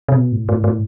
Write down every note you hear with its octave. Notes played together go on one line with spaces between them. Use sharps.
C3
B2
A2
A2
A2